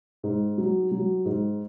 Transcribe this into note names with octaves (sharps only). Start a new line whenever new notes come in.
G#2
F#3
F#3
G#2